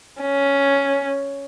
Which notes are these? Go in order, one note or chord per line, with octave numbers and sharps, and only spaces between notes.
C#4